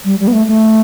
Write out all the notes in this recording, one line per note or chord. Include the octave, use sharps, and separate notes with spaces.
G3
G3
B3
A3
A3